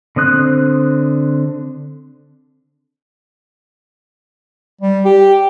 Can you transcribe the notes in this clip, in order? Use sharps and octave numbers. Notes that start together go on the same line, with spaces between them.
D3 C4 D#6 F#6
G3
G4